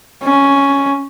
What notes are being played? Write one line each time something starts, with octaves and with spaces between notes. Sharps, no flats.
C#4